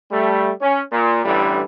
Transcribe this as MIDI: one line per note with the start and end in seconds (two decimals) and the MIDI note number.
0.11 0.51 55
0.11 0.51 57
0.61 0.81 61
0.91 1.19 46
1.25 1.61 33
1.25 1.61 43
1.25 1.61 50
1.25 1.61 52
1.25 1.61 55